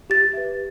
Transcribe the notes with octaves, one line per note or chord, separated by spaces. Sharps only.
G4 A6
B4 E5